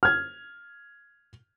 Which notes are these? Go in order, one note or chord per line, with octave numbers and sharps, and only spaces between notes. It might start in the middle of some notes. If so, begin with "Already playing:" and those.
F6 G#6